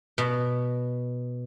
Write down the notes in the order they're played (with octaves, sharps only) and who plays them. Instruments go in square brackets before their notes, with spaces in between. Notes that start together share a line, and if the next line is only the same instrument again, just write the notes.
[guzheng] B2